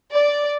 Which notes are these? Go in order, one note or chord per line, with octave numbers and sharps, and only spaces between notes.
D5